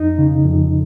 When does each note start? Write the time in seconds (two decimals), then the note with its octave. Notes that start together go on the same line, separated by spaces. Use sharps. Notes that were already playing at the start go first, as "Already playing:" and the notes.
Already playing: F2 D#4
0.18 C#3
0.46 F2